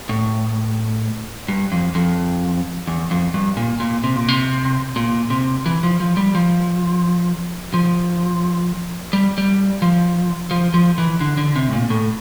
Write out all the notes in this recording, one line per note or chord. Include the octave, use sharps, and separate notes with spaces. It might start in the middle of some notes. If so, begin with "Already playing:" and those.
A2
G2
F2
F2
E2
F2
G2
A#2
A#2
C3
A#2
C3
A#2
C3
E3
F3
F3
G3
F3
F3
G3
G3
F3
F3
F3
E3
D3
D3
C3
A2
A#2
A2